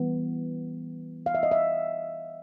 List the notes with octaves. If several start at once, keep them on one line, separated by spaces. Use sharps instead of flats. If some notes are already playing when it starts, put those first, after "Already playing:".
Already playing: E3 G3 B3
F5
E5
D#5
E5